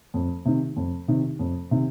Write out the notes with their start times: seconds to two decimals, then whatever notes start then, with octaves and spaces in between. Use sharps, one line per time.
0.14 F2
0.45 C3 D#3
0.76 F2
1.08 C3 D#3
1.39 F2
1.71 C3 D#3